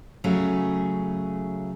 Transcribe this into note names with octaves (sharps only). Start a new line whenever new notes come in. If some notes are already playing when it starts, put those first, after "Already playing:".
C#3 F#3 A3 G#4